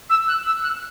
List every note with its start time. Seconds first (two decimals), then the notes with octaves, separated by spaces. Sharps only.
0.10 E6
0.28 F#6
0.46 E6
0.63 F#6